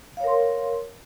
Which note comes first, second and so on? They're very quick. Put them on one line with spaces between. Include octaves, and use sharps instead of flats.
F5 C#5 A#4 C6